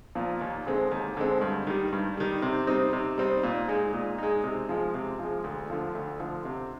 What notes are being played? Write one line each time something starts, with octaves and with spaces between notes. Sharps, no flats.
A#2 F3
D#2
D3 G#3 C4
D#2
D3 G#3 C4
G2
D#3 G3
G2
D#3 G3
C3
G3 C4 D#4
C3
G3 C4 D#4
A#2
G#3 D#4
A#2
G#3 D#4
C3
F3 G#3
C3
F3 G#3
D2
D3 F3
D2
D3 F3
C3